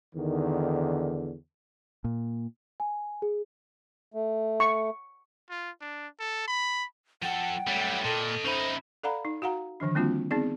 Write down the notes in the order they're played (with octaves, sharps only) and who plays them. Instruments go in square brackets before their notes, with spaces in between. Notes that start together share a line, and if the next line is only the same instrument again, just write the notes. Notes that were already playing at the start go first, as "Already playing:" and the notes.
[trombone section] E2 D3 D#3
[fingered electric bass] A#2
[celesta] G#5
G#4
[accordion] A3
[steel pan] C#6
[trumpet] F4
D4
A4
B5
[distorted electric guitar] F3 A4 [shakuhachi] F#5 [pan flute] G5
[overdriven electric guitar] F#3 A3 [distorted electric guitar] G3
[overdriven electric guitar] A#2 [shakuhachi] A4 [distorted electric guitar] D#5 A5
[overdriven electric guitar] C#3 E4 [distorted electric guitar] D#4 [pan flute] C5
[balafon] A4 D5 F5 F#5 A#5 B5
D#4
F#4 F5 F#5 A#5
D3 D#3 F3 D4
G3 A#3 C4 D4 F4 F#4
B3 C4 D#4 G#4 D5